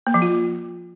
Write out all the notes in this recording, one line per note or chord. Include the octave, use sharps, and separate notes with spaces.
A#3
F3
F4